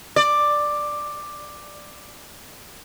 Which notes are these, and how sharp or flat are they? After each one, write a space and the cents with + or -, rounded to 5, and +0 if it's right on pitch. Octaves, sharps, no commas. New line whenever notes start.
D5 +10